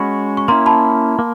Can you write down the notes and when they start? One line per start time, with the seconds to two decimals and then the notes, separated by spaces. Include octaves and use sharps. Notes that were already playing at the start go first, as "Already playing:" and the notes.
Already playing: G#3 C#4 F#4 B5 C#6
0.37 C#6
0.48 A#3 C#4 E4 A#5 C6
0.66 A5 B5
1.19 A#3